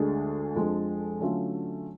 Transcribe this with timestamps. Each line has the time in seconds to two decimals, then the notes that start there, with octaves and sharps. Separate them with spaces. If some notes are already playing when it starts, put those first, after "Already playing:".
Already playing: D2 D3 G#3 D4 G#4
0.55 F2 F3 G#3 D4
1.20 D3 F#3 A3 C#4 F4